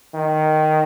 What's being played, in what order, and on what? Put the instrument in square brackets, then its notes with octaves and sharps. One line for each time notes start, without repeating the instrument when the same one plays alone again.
[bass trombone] D#3